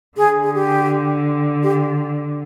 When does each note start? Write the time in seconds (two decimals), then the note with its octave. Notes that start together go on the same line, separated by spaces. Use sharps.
0.17 D3 G#4
0.44 G#4
0.54 G4
1.63 G4